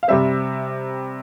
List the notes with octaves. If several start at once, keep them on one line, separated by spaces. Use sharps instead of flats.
F5
C3 G3 C4 E5